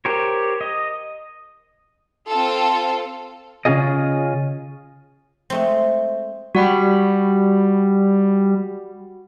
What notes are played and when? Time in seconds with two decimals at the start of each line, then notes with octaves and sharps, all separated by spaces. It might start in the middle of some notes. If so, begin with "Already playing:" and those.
0.05 G4 A#4 C5 C#5
0.61 D#5
2.28 C4 F4 A4
3.65 C#3 C#4 D4 F4 G#4 D#5
5.50 G#3 A3 C4
6.55 G3 F#4 F#5 B5